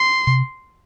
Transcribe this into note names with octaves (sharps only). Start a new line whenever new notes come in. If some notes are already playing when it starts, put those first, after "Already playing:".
Already playing: C6
C3